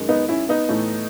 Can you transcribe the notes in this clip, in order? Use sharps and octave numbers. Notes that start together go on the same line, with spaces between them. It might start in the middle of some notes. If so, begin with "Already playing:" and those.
Already playing: F#2 D#3 G#3
B3 D#4
C#4 E4
B3 D#4
A2 E3 A3